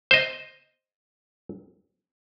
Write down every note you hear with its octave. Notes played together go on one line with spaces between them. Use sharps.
C5 D#5